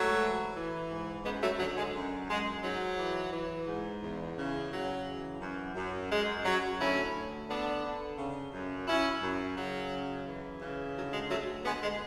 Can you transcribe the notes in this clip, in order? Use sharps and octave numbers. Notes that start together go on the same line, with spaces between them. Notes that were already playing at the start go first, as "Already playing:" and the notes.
Already playing: G#2 F#3 A3
E3
E3
G#2
F#2 G#3 B3
F#3 A3
D3 F#3
G#3
F#2
F#2 G#3
G#2 F#3
E3
E3
G#2
E2
C#3
C#3 F#3
E3
F#2
F#2
F#2 G#3
F#2 F#3
D2 C#4 E4
D2
D3 B3 D4
D3
C#3
F#2
F#2 C#4 E4
F#2
C#3 F#3
F#2
E3
C#3
D3 F#3
G#3
D2 F#3 A3
D3 G#3 B3
G#3